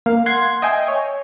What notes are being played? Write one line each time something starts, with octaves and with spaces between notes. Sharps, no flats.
A#3 F5
F#5 C6 G#6 C7
D#5 E5 G5 G#5
C#5